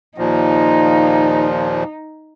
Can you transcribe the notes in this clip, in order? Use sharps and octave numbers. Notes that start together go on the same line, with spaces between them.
D#2 A#2 F3 D#4